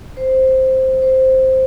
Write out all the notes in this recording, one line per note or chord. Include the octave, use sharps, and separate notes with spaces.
C5
C5